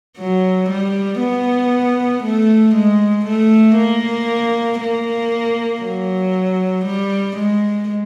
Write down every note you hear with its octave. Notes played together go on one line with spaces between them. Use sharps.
F#3
G3
B3
A3
G#3
A3
A#3
A#3
F#3
G3
G#3